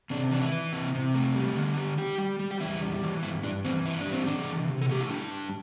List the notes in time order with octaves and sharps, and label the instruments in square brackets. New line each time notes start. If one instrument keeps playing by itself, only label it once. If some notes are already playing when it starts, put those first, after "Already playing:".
[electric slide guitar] C3 D4
E3 D4
E4
E3
C3
C3
A3
G3
D3
G3
G3 G4
G3
G3
G4
E2 E4
G3
E3
G2 E4
G2 D4
E3 C4
G2 E4
D4
G3
C4
E3 D4
C3
C3
A4
A3 G4
E4
G3 D4
G2